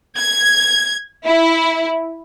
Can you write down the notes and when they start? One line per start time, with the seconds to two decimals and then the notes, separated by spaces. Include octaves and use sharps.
0.18 G#6
1.25 E4